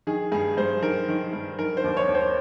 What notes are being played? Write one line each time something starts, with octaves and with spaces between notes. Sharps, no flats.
D#3 G#4
G2 G#4
G2 C5
D#3 A#4
D#3
G2
D#3 A#4
C5
D#2
C#5
D#2
C5